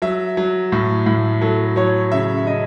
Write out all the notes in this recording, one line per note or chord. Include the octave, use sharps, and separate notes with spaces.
F#3 E5
F#3
A2
A2
F#3 A4
F#3 C#5
C#3 E5
C#3 D#5